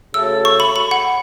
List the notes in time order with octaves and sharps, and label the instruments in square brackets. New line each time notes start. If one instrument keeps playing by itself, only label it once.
[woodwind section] C#3 A3 F#4 A4 C#5 [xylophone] E6
[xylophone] C#6
B5
B5
F#5